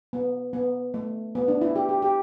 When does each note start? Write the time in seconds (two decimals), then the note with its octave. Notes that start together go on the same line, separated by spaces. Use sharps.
0.13 B3
0.53 B3
0.94 A3
1.35 B3
1.48 D4
1.61 E4
1.76 G4
1.89 G4
2.02 G4